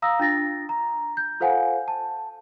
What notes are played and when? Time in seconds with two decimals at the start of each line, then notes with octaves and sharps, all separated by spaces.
0.02 F5 A#5 D#6 E6 A#6
0.19 D4 F4 A6 A#6
0.69 A#5
1.17 G6
1.40 F4 A4 C5 F5 F#5 G#5
1.88 A5